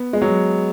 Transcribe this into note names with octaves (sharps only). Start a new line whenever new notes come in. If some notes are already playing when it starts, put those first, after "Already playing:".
Already playing: B3
G#3
F#3